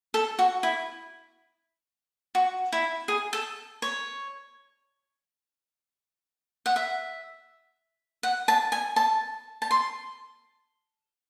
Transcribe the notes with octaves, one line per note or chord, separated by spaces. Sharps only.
A4
F#4
E4
F#4
E4
G#4
A4
C#5
F#5
E5
F#5
A5
G#5
A5
A5
C6